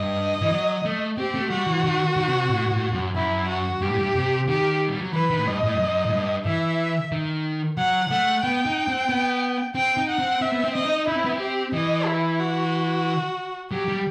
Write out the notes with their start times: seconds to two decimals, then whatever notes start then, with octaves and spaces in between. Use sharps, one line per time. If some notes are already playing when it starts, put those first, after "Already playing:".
Already playing: G2 D#5
0.42 E3
0.52 F#3
0.85 A3
1.18 C4 G4
1.35 A3
1.50 G3 F#4
1.67 E3
1.84 D#3
2.17 D#3
2.28 C3
2.49 A2
2.72 A2
2.93 F#2
3.15 F#2 E4
3.49 F#4
3.81 G2 G4
3.90 A2
3.99 G2
4.15 C3
4.48 D#3 G4
4.88 G3
5.01 F#3
5.13 E3 B4
5.30 D#3
5.39 A2
5.47 G2 D#5
5.63 A2
5.75 G2
5.80 F#2
6.05 A2
6.12 G2
6.46 E3 E5
7.12 D#3
7.77 F#3 F#5
8.10 A3 F#5
8.44 B3 G5
8.66 D#4
8.88 C4
9.09 B3
9.75 C4 G5
9.97 D#4
10.09 F#5
10.19 C4
10.41 C4 E5
10.53 B3
10.64 C4
10.74 C4 D#5
10.86 D#4
11.08 D#4 E4
11.17 C4
11.25 B3
11.34 C4
11.40 G4
11.73 E3 D#5
12.07 E4
12.39 F#4
13.71 F#3 G4
13.88 G3